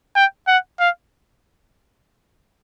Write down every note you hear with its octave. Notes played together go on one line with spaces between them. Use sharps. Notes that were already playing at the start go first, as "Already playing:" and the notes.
G5
F#5
F5